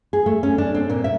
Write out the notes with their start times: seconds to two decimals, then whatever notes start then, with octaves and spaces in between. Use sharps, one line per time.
0.13 G#4
0.26 A3
0.43 C#4
0.58 D4
0.75 C4
0.90 A#2
1.04 E5